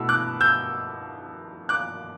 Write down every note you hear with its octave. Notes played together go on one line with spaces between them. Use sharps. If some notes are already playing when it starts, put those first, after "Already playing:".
Already playing: B2 A3 E4 E6
D6 F#6
E6 G6
D6 F#6